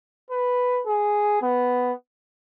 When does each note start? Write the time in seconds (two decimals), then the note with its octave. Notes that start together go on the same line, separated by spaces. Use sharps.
0.31 B4
0.87 G#4
1.42 B3